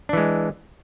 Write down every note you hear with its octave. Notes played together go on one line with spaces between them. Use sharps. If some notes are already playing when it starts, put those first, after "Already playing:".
E3 G#3 D4